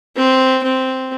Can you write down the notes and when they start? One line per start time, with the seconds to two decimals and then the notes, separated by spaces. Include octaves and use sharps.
0.16 C4
0.63 C4